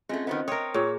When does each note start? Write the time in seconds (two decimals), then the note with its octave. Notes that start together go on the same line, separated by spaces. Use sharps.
0.09 G#3 A3 C4 C#4 F4
0.27 D#3 F#3 B3 C5 D#5
0.48 C4 A#4 C#5 D#6
0.74 A#2 G#4 A#4 C#5